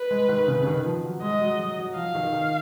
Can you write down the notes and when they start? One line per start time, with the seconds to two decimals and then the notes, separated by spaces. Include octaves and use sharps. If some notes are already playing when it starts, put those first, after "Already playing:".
Already playing: B4
0.11 G#3
0.29 D#3
0.48 C#3
0.62 C#3
0.67 D#3
0.85 F3
1.04 F#3
1.22 G#3 D#5
1.41 F#3
1.59 F#3
1.78 F#3
1.96 F3 F5
2.15 D#3
2.33 D#3